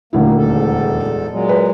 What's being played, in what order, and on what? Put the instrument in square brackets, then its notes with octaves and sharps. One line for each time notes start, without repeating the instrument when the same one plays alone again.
[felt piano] D#1 D2 E4 [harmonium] A#3
[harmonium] E2 G#2 A4
A#2 F#3 G#3
[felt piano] B4